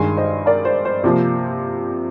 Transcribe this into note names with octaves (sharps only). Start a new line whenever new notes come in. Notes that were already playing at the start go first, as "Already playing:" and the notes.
Already playing: G2 D#3 G#3 G#5 C6
C5 D#5
A#4 D5
C5
C5
C3 F3 A#3